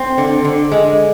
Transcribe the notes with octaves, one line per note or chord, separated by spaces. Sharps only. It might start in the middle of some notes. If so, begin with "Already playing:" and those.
Already playing: C4
D3
D3
G#3